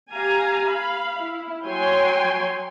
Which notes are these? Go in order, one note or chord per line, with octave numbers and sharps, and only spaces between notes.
G4 F5 G#5 A#5
F5 B5
E4
F#3 C#5 G5 G#5 C6